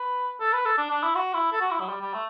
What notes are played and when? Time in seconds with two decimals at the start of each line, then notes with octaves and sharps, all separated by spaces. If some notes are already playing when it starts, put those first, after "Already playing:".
Already playing: B4
0.40 A4
0.53 B4
0.65 A4
0.78 D4
0.90 D4
1.03 E4
1.15 F#4
1.33 E4
1.52 A4
1.61 F#4
1.71 E4
1.80 F#3
1.89 G3
2.01 G3
2.14 A3